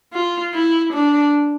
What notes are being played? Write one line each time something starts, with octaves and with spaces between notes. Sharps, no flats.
F4
E4
D4